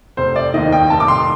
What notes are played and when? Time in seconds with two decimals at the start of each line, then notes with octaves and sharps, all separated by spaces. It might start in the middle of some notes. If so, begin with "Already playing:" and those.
0.17 F1 C5
0.36 D5
0.54 D#2 D#3 D#5
0.72 G5
0.90 F1 A5
1.00 D6
1.08 C6